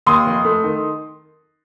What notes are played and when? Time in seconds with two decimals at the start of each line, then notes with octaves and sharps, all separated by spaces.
0.06 D#2 C6 D#6
0.26 F1
0.45 A3
0.64 D#3